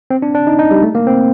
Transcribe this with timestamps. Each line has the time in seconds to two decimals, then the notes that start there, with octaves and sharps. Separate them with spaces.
0.10 C4
0.22 D4
0.35 D4
0.47 D#4
0.59 D#4
0.71 G3
0.83 A3
0.95 A#3
1.07 C4